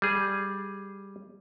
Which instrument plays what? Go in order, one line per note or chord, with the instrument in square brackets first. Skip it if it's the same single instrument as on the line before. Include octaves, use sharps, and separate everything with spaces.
[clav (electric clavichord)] G3 G#4